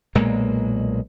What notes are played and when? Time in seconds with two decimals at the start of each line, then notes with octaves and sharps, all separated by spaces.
0.15 B1 A#2 G#3 A#3